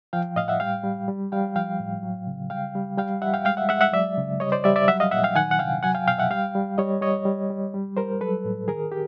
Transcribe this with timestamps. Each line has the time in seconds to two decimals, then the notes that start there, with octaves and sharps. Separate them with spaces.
0.13 F3 F5 G5
0.36 A2 D#5 F5
0.48 E5 F#5
0.60 G3 F5 G5
0.84 G3
1.08 G3
1.32 G3 F5 G5
1.56 F3 F5 G5
1.80 A2
2.03 F#3
2.27 C#3
2.50 G3 F5 G5
2.75 G3
2.98 G3 F5 G5
3.22 G3 E5 F#5
3.34 F5 G5
3.45 G#3 F5 G5
3.57 E5 F#5
3.69 G#3 E5 F#5
3.81 E5 F#5
3.93 F#3 D5 E5
4.17 C#3
4.40 G3 C#5 D#5
4.52 C5 D5
4.64 G3 D5 E5
4.76 D5 E5
4.88 F#3 E5 F#5
5.00 D#5 F5
5.11 A#2 E5 F#5
5.24 F5 G5
5.36 D#3 F#5 G#5
5.51 F#5
5.59 C3 F5 G5
5.83 F#3 F#5 G#5
5.95 F5 G5
6.07 B2 F5 G5
6.18 E5 F#5
6.31 G3 F5 G5
6.55 G3
6.78 G3 C#5 D#5
7.02 G3 C#5 D#5
7.25 G3
7.50 G3
7.74 G3
7.97 G3 A#4 C5
8.21 F#3 A4 B4
8.44 A2
8.68 D#3 G#4 A#4
8.92 G4